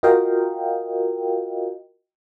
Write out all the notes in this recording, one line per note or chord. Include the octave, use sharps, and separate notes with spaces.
F4 F#4 A#4 D#5 F5 G5